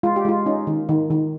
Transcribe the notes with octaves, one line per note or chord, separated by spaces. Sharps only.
G#3 F4
G4
G#3 F4
C#4 D#4
D#3
D#3
D#3